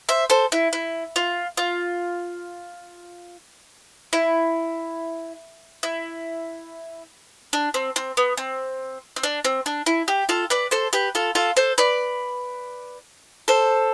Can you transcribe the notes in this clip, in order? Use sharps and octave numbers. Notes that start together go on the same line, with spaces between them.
C5 E5
A4 C5
E4
E4
F4
F4
E4
E4
D4
C4
C4
B3
C4
C4
D4
C4
D4
E4
G4
F4 A4
B4 D5
A4 C5
G4 B4
F4 A4
F4 A4
A4 C5
B4 D5
A4 C5